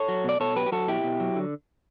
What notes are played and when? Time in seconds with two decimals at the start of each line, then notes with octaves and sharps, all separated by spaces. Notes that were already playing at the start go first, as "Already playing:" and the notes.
Already playing: A4 C#5
0.08 F#3
0.24 B2 D5
0.40 B2 A4 C#5
0.56 F#3 G4 B4
0.66 G4
0.72 F#3 F#4 A4
0.88 B2 E4 G4
1.04 B2
1.20 F#3
1.36 D3